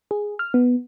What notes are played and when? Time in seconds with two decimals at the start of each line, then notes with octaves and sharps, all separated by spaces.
0.11 G#4
0.39 F6
0.54 B3